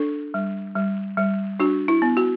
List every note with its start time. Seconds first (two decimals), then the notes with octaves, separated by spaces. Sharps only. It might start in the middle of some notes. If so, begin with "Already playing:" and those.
Already playing: D4 A4
0.34 G3
0.75 G3
1.17 G3
1.60 D4 F#4
1.88 E4
2.02 B3
2.17 F#4